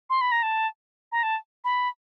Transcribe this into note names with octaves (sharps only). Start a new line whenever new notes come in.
C6
B5
A#5
A5
A#5
A5
B5